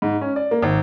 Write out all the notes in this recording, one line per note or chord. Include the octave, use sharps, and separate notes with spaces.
G#2
C#4
D5
A#3
G#1